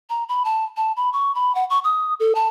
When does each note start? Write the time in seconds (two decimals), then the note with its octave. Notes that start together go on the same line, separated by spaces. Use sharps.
0.10 A#5
0.29 B5
0.45 A5
0.77 A5
0.97 B5
1.13 C#6
1.35 B5
1.55 F#5
1.70 C#6
1.84 D#6
2.20 A4
2.35 A5